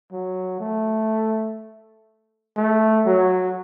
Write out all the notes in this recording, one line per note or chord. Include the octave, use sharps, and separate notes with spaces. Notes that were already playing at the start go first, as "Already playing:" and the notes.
F#3
A3
A3
F#3